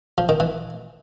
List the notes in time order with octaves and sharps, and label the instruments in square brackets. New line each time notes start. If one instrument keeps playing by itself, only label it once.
[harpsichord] F3
D#3
E3